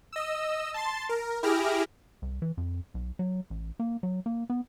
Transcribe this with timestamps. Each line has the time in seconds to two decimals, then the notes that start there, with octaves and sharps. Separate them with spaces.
0.13 D#5 E6
0.74 A5 C6 A6
1.09 A#4
1.43 E4 G4 G#4 F6 A#6 D7
2.22 C2
2.42 E3
2.57 F2
2.94 B1
3.19 F#3
3.50 A1
3.79 A#3
4.03 F#3
4.26 A#3
4.50 B3